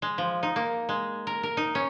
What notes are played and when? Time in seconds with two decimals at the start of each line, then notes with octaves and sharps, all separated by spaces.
0.02 G#3
0.18 F3
0.43 D#4
0.56 A#3
0.89 G#3
1.27 A#4
1.43 A#4
1.57 D#4
1.75 C#4